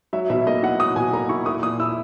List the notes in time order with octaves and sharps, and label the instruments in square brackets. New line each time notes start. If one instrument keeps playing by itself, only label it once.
[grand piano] F#3 E5
B2 E5
A#3 D#5
E4 F#5
F#3 D#6
B2 G#5
A#3 A#5
E4 C#6
A#3 D#6
A#2 D#6
E4 E6